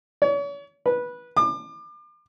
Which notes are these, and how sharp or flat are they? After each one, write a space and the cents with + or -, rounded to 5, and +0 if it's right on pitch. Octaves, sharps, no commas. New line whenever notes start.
C#5 +40
B4 -15
D6 +35